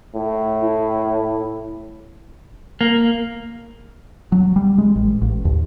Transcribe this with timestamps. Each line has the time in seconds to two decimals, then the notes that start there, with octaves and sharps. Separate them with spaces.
0.15 A2
0.62 E4
2.81 A#3
4.32 F#3
4.56 G3
4.78 G#3
4.96 A1
5.22 A1
5.45 D#2